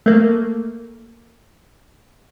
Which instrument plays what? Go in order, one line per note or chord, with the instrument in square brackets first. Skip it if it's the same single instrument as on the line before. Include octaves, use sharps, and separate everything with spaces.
[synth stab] A3 A#3